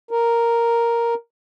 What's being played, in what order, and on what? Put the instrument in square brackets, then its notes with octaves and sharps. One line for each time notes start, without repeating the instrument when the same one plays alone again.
[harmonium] A#4